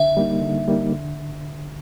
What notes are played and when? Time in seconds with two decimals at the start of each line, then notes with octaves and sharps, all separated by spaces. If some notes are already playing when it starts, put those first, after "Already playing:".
Already playing: D3 E5
0.17 G3 A#3 D#4
0.42 D3
0.68 G3 A#3 D#4
0.92 D3